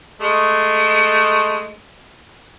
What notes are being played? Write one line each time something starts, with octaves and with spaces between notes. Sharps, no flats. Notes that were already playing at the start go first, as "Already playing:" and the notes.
G#3 A3